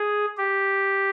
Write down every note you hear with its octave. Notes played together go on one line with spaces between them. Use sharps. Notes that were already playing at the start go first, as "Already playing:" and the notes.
Already playing: G#4
G4